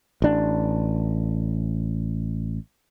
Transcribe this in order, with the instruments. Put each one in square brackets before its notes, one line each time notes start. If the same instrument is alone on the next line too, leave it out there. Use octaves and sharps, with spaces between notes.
[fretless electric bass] A1 D4